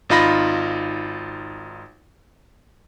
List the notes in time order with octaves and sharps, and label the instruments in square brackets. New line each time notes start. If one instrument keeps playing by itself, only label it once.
[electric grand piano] G#1 D#4 F4 B5 A#6